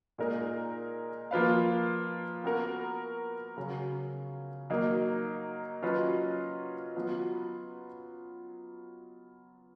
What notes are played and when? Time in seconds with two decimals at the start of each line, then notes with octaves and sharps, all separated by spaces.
0.18 A#2 G#3 D#4 A#4
1.31 F3 A#3 F4 B4 F5
2.44 B3 F#4 A#4
3.57 C#3 F#3 C#4
4.70 F#3 A#3 D#4
5.82 F#3 C#4 F4 B4 D#5
6.95 F#3 B3 F4 B4